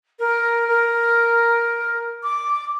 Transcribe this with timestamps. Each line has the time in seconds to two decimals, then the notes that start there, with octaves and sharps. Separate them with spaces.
0.19 A#4
0.68 A#4
2.23 D6